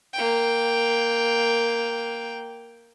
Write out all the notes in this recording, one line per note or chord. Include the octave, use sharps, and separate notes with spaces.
A#3 G5